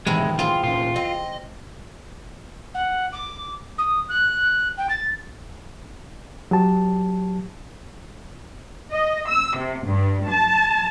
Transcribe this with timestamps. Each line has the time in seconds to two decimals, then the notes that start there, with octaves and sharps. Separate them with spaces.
0.07 E2 A2 C3 D#3 G3 G#3 E4
0.39 C4 F4 G#4
0.64 A#2 C#4 F4
0.96 C4 D#5
2.75 F#5
3.13 D6
3.78 D#6
4.09 F#6
4.78 G5
4.90 A6
6.51 F#3 G4 A5
8.91 D#5
9.28 E6
9.57 C3
9.86 G2
10.27 A5